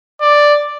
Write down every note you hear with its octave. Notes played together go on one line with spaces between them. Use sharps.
D5